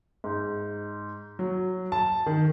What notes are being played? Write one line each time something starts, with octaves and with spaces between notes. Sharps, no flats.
G#2
F#3
A5
D#3